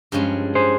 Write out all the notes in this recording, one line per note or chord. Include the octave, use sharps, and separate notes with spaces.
G2 F3 G#3 C#4
G#4 C5